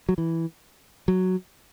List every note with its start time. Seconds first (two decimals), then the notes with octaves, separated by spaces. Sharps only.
0.09 F#3
0.18 E3
1.08 F#3